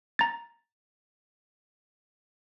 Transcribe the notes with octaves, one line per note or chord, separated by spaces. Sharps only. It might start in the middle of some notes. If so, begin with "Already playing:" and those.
A#5 A6